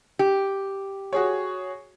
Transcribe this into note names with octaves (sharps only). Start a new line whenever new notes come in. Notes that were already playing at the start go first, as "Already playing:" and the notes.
G4
F#4 G#4 C#5